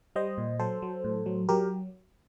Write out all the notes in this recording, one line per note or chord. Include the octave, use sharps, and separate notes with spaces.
G3 C5 D#5
A#2
F#3 A4 C5
F#3
A2
F#3
F#3 G4 A#4